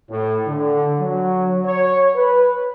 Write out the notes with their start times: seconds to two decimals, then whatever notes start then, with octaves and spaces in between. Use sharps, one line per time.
0.10 A2
0.48 D3
1.00 F#3
1.65 C#5
2.16 B4